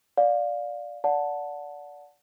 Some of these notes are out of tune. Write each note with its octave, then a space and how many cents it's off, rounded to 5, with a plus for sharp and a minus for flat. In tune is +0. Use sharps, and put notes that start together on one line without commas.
D5 +0 F5 +15
D5 -20 F#5 -20 A5 +0